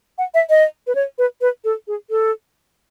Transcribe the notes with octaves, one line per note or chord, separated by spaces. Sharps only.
F#5
E5
D#5
B4
C#5
B4
B4
A4
G#4
A4